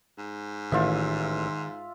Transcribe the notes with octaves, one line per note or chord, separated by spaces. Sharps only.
G#2
A1 D#3 F4 E5